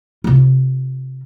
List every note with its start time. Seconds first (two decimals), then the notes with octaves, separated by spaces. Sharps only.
0.24 C3 F4